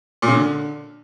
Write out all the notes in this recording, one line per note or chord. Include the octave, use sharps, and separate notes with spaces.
A#2
C#3
D3